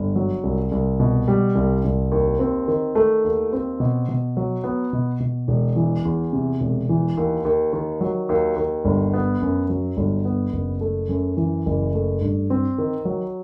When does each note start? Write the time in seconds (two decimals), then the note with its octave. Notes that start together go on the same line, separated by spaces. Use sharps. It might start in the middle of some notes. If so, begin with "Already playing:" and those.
Already playing: G1
0.16 F#3
0.43 C2
0.72 C2
1.00 B2
1.28 G3
1.55 C2
1.84 C2
2.11 D#2
2.39 C4
2.68 D#3
2.95 A3
3.24 D#2
3.53 C4
3.80 B2
4.08 B2
4.37 F#3
4.64 B3
4.93 B2
5.20 B2
5.48 E1
5.76 E3
6.05 E2
6.33 C3
6.60 E1
6.89 E3
7.17 D#2
7.45 D#2
7.73 D#3
8.01 F#3
8.29 D#2
8.56 D#2
8.85 G1
9.13 B3
9.42 F#2
9.69 F#3
9.97 G1
10.25 B3
10.53 F#1
10.81 A3
11.09 F#2
11.37 E3
11.66 F#1
11.94 A3
12.21 G2
12.50 C4
12.78 D#3
13.05 F#3